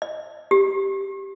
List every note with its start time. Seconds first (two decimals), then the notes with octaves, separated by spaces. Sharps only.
0.02 D#5
0.51 G4